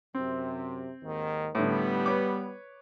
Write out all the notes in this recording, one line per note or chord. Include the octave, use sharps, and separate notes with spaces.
F#2 C3 C4
D#2 G#2 D#3
A2 D3 G3 B3
B4 C#5 D6